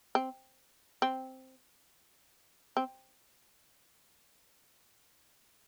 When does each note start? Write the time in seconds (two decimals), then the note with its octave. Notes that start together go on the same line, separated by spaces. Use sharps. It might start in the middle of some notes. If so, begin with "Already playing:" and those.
0.15 C4
1.02 C4
2.77 C4